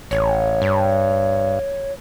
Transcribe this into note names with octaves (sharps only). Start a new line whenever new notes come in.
A1 C#5
G2